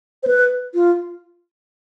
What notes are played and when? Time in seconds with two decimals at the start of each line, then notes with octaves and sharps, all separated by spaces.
0.23 C5
0.27 B4
0.75 F4